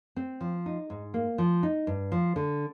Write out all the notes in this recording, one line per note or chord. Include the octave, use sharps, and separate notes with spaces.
C4
F3
D#4
G#2
A#3
F3
D#4
G2
F3
D3